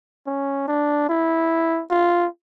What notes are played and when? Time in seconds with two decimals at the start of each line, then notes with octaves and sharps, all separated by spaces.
0.26 C#4
0.68 D4
1.09 E4
1.90 F4